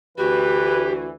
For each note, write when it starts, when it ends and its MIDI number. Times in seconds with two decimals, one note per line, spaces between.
0.18 1.11 38
0.18 1.11 52
0.18 1.05 66
0.18 0.92 67
0.18 0.88 71